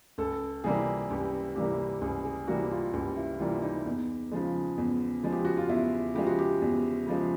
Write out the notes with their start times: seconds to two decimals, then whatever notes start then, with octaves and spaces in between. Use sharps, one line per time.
0.18 C#2 A4
0.64 C3 E3 G3 A#3 G#4
1.10 C#2 G4
1.56 C3 E3 G3 A#3 G4
2.01 C#2 G#4
2.25 G#4
2.47 C3 E3 G3 A#3 F#4
2.71 F4
2.93 C#2 G4
3.17 E4
3.39 C3 E3 G3 A#3 F4
3.62 D#4
3.86 E2
4.31 C#3 F3 G#3
4.78 E2
5.23 C#3 F3 G#3
5.32 G4
5.45 F#4
5.57 F4
5.69 E2 E4
6.15 C#3 F3 G#3 G4
6.27 F#4
6.39 G4
6.62 E2
7.07 C#3 F3 G#3